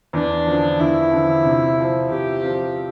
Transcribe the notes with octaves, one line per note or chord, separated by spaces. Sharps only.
E2 D4
D3 F3
E2 E4
D3 F3
C3
F3 C4 F4
C3 G4
F3 C4 F4